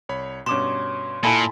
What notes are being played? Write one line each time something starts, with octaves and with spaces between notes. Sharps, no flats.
C2 C#5 B5
G2 B2 C#4 C6 D6 E7
A#2 E4 A4 G#5 A5 B5 A6